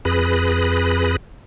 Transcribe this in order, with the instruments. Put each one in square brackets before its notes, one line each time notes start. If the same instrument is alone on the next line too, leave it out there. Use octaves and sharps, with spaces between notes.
[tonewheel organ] F2 G#4 B4 B5 A#6